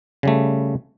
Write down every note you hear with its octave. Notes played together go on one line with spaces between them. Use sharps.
C#3 G3 A3